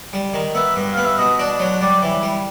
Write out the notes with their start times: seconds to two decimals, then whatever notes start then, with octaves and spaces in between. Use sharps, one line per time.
0.13 G3
0.34 D#3
0.55 B3 E5
0.76 G2
0.94 B3 F5
1.06 E5
1.18 B2 D#5
1.39 D4
1.60 F#3
1.81 G3 D5
2.03 E3
2.23 G3